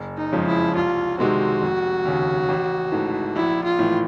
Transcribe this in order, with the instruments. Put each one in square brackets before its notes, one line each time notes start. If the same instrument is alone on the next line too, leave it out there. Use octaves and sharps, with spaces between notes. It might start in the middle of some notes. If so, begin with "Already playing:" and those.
Already playing: [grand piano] F#1
[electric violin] D#4
[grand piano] F2 C#3 F3 G#3
[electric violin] E4
[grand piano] C2 [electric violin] F4
[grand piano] C3 D#3 G#3 C4 [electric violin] F#4
[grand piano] F1
D#2 C#3
A1
G#2 E3 A3
[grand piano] A#1 [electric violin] E4
[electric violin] F4
[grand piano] A2 E3